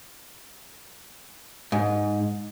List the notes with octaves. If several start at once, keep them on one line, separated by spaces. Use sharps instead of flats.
G#2